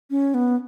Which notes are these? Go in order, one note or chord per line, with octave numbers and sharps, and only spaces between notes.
C#4
B3